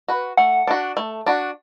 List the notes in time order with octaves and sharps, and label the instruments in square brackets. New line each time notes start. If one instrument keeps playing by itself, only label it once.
[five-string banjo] F#4 B4
[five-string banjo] A3 [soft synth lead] F#5
[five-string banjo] D4 F#4
A3
D4 F#4